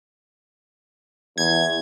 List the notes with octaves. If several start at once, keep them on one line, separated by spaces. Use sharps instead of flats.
E2 G#6